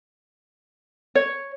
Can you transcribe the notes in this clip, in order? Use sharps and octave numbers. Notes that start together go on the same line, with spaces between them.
C#5